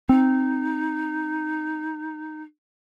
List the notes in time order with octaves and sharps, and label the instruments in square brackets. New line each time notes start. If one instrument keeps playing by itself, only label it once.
[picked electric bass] C4 [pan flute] D#4